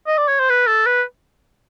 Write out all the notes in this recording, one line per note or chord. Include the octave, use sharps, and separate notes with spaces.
D#5
D5
C#5
C5
B4
A4
B4